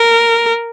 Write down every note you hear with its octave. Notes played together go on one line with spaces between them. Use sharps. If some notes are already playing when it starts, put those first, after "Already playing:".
Already playing: A#4